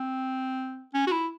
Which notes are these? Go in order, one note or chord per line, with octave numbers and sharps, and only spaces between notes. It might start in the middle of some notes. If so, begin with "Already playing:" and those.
Already playing: C4
C#4
F#4
E4